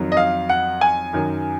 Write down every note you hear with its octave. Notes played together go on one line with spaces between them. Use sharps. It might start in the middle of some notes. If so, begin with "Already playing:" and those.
Already playing: F2 D#3 F#3
D#5
F5
F#5
G#5
F#2 D#3 F#3